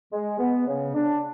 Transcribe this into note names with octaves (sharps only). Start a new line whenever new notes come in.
G#3
B3
C#3
D4